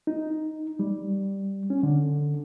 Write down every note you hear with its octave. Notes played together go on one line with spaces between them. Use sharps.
D#4
G3
C#4
D3